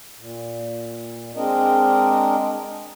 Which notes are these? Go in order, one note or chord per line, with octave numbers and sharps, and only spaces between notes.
A#2
G#3 C4 D4 A#4 D#5